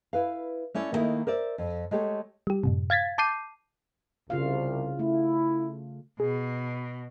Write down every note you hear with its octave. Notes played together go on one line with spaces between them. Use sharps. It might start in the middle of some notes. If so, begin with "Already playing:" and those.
E4 B4 F5
A3 C#4 E4 D5
D#3 G3 A3 A#3 D#4 E4
A#4 C5 D5 E5
F2
G#3 A3 G4 C#5
G3 G4
F#2 A2 C3
F5 G#6 A6 B6
A5 D6 G6 C7 D#7
C2 C#3 F4 F5
A3 E4
B2 G#4